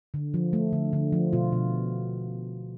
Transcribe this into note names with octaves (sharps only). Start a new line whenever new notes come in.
D3
F3
A3
D3
D3
F3
B2 F4
B2